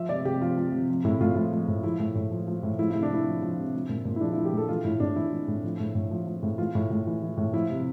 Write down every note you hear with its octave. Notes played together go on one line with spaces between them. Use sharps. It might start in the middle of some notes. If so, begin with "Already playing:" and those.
Already playing: F3 E5
C3 D5
C3 G4
F3 F4
F3
C3
F3
A2 E4
A2 F4
F3 F4
F3
A2
F3 E4
A2
A2
F3
F3
A2
F3 E4
C3 E4
D4
C3 E4
F3
F3
C3
F3
A#2
A#2
E4
F3 D4
F3 E4
G4
A#2 A4
E3 F4
A2 E4
A2 D4
E3 E4
E3
A2
F3
A2
A2
F3
F3
A2
E3 F4
A2
A2
E3
E3
A2
F3 E4
C3